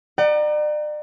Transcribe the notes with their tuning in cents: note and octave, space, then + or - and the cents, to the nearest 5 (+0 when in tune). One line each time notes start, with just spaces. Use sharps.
D5 +40 F#5 +40 A#5 +10